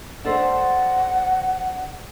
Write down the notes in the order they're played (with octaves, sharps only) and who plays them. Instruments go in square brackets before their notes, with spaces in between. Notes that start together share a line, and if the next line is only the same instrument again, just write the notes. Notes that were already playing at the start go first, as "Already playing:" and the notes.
[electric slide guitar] D4 A4 C5 [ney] F#5